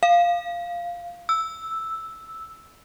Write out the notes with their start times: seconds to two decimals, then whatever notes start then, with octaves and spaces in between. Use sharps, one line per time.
0.03 F5
1.29 E6